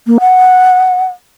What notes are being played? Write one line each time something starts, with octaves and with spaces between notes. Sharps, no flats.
A#3
F#5